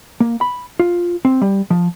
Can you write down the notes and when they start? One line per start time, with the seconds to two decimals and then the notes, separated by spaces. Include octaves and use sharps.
0.20 A#3
0.41 B5
0.80 F4
1.25 C4
1.42 G3
1.70 F3